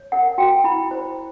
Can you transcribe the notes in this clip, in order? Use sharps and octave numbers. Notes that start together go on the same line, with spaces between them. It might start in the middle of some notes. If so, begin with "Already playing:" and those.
Already playing: C#5
A#4 F#5
F#4 G5
E4 B5
C5